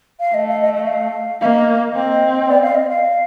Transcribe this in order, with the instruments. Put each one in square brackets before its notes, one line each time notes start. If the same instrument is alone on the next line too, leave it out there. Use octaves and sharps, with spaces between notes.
[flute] F5
[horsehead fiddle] A3 [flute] D#5
[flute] F5
D#5
D#5
F5
[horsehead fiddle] A#3 [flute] D#5 F5
[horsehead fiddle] C4
[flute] D5
F5
D#5
F5